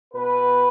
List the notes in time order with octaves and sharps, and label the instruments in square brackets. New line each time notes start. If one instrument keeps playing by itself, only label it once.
[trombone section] B2 B3 B4